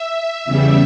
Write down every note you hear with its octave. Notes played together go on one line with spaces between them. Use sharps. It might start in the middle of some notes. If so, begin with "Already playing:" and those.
Already playing: E5
E2 C#3 G3